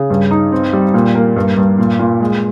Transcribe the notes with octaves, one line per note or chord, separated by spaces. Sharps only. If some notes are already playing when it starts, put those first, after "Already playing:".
Already playing: C#3
G2
D#4
C4
G3
A#2
A#3
G2
G2
A#2
A#2
G#3